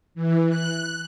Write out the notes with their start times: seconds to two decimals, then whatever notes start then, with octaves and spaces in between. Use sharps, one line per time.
0.15 E3
0.49 F#6